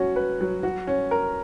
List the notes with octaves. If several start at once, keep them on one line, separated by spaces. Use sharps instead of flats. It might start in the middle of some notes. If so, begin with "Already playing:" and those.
Already playing: F#3 C#4 F#4
B4
F#3
F#4
C#4
A#4